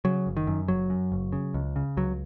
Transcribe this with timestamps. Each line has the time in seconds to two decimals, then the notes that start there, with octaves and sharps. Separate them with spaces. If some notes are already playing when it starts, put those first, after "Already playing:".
0.05 C#3 F#3
0.27 F#1
0.37 D#3
0.47 F#2
0.68 F#1 F#3
0.90 F#2
1.12 F#1
1.32 C#3
1.54 C#2
1.76 C#3
1.97 C#2 F#3